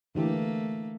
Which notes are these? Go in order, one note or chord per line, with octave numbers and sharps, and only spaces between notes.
D3 E3 A3 A#3 G4